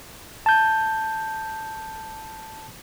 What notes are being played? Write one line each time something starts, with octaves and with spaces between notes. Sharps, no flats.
A5 G6